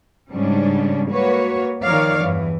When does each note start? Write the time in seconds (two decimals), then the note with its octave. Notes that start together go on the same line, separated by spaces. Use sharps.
0.31 G#2 C#3 G3 C#4 D4
1.10 A#3 F#4 B4 C#5
1.83 D#3 F3 A#4 C#5 D5 F5
2.22 E2 G2 E3